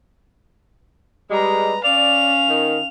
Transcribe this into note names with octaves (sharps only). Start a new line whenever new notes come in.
G3 G#3 B4 A#5
C#4 D5 F5 F7
D#3